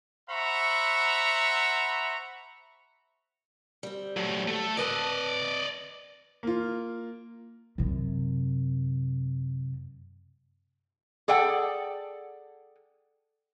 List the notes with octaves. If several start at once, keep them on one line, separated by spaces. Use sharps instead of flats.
C5 E5 F#5 A#5 B5 C#6
G3 C4
F#3 A3
A3 A4
C4 B4 D5 D#5 A5
A#3 F4
F#2 C3
G#4 A4 D5 F#5 G5